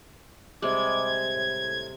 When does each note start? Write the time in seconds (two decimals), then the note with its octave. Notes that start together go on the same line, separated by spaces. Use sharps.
0.62 C3 G3 G#3 D#5 D6 G#6
1.35 A2